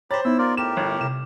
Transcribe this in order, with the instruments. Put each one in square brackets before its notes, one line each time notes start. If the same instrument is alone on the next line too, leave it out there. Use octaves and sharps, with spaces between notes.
[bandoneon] G4 A#5 B5 [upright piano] C5 A6 [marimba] C#5
[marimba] B3 D#4 [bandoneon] E4 E6
[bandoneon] F4 A#4 D5
[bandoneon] A2 G4 A#4 [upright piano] E7
[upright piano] G1
[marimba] C3 [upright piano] E7